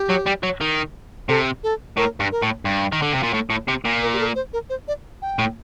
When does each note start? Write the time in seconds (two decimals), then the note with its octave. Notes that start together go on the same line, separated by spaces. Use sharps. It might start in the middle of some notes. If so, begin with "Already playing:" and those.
Already playing: G4
0.09 F#3
0.26 G3
0.43 F#3
0.61 D#3
1.29 C3 A4
1.63 A4
1.97 A2 A#4
2.20 G2
2.32 A#4
2.42 A2
2.65 G2
2.92 D#3
3.02 D3
3.13 C3
3.23 A#2
3.34 A2
3.50 A2
3.68 C3
3.85 A#2
4.02 A#4
4.13 G4
4.20 A4
4.35 C5
4.53 A#4
4.70 C5
4.88 D5
5.22 G5
5.39 A2